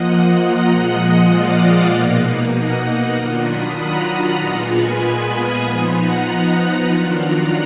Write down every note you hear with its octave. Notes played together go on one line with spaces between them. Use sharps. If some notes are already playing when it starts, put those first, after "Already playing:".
Already playing: F3 A#3 F4 D#5 F#5
F#5 A#5
A#2 F3 G#3 D#5 F#5
D5 F5
D#5 F#5
B2 A#3 D#4
D#5 F#5
D#3 F#3 D4 F4 D6 F6
B5 D#6
F#5 A#5
F#5 A#5
A#2 G#3 B3 F4 A#5 D6
G#5 B5
G#5 B5
B5 D#6
F3 B3 D#4 G#5 B5
F#5 A#5
D#3 F#3 D4 F4
F#5 A#5